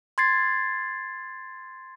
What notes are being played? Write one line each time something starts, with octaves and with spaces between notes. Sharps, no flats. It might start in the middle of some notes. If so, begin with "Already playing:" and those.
C6 G#6 A6 C7